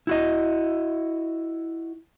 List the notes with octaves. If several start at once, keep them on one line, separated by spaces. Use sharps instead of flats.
E4 F#4 D#5